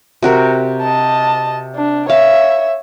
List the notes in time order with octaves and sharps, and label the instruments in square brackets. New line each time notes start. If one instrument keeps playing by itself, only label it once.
[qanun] C3 F#4 A#4
[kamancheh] D#5 A5
D4
[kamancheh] C#5 E5 [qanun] F5